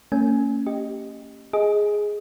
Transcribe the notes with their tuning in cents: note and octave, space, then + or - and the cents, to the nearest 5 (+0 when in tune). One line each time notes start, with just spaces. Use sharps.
A#3 -40 C#4 +0 G#5 +10
G4 +0 D#5 -5
G#4 +0 D#5 +15